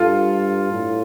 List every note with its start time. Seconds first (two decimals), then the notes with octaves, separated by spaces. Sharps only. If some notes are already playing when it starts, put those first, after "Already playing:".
Already playing: G2 F4 A4
0.72 A2